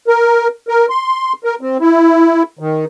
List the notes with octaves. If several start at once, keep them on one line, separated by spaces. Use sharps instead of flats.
A#4
A#4
C6
A#4
C4
E4
D#3